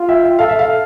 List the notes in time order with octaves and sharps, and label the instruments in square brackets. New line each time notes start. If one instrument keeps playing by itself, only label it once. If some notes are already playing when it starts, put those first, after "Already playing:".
Already playing: [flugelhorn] F4
[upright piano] E5 G5
E5
[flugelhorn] A4 [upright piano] F5
[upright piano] E5
F5